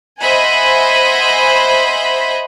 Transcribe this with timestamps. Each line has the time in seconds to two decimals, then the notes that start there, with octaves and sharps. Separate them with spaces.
0.20 C5 D#5 E5 F#5 G#5 B5